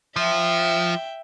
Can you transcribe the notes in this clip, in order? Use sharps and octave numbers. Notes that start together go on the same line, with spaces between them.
F3 E5 G5